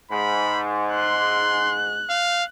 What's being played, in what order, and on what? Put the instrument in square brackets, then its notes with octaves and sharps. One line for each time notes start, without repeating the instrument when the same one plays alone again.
[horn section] G#2 [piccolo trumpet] B5
[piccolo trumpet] C6 [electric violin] F#6
[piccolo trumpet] F5